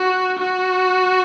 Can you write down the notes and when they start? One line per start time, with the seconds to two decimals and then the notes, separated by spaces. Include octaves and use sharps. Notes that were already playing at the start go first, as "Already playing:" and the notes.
Already playing: F#4
0.39 F#4